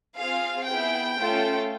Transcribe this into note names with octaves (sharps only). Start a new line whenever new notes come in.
C4 F4 G#4 F5
B3 E4 G#4 G5
A3 C#4 F4 A4